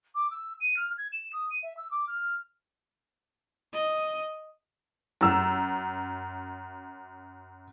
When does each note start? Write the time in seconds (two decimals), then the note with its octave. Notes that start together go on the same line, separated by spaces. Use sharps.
0.15 D6
0.31 E6
0.60 D#7
0.77 F6
0.98 G#6
1.12 E7
1.33 D#6
1.51 D#7
1.63 E5
1.77 E6
1.91 D6
2.07 F6
3.73 D#5
5.21 F#2 E6